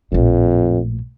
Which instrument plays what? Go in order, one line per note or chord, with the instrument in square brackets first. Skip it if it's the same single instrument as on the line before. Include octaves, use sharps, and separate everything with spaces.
[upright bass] A#1 A2 [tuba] F2